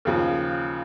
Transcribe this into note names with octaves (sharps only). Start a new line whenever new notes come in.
D#2 C#3 F3